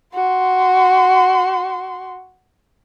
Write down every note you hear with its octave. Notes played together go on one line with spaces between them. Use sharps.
F#4 C6